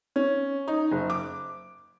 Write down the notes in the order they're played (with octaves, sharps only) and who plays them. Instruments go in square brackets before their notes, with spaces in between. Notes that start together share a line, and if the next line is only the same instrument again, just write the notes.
[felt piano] C#4
D#4
F#1
D6